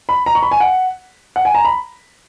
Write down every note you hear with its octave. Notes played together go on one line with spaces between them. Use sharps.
B5
A#5
C#6
B5
G#5
F#5
F#5
G#5
A#5
B5